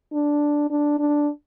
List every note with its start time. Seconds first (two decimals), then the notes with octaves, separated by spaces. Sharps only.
0.13 D4
0.70 D4
0.99 D4